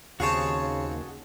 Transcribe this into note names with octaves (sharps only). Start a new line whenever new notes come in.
D#2 C#3 C4 F#4 G#4 C#5 F5 A5